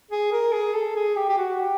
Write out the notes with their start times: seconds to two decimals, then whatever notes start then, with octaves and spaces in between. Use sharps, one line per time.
0.11 G#4
0.32 A#4
0.53 G#4
0.74 A4
0.96 G#4
1.16 G4
1.29 G4
1.38 F#4
1.59 G4